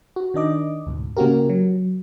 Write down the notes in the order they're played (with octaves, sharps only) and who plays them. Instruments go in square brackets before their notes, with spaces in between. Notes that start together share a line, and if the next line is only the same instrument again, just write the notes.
[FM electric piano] F#4
D#3 D4 D#5 D6
D2 G#2 B2
C#3 A#3 C#4 F#4 G4 A#4
F#3